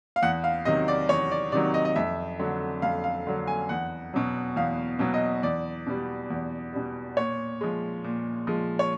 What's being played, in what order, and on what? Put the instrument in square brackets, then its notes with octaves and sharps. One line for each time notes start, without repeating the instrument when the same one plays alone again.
[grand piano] F5
E2 F#5
F5
C3 D#3 F#3 D#5
D5
E2 C#5
D5
C3 D#3 F#3 D5
D#5
D#5
F2 E5
D3 F#3
F2 F5
F5
D3 F#3
G#5
E2 F#5
B2 F#3
E2 F5
B2 F#3
D#5
E2 D5
B2 G3
E2
B2 G3
A#2 C#5
F3 G#3
A#2
F3 G#3
C#5